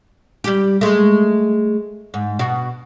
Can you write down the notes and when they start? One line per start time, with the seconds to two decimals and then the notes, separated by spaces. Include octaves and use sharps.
0.44 G3 G4
0.81 G#3 A3
2.14 G#2
2.39 B2 F#4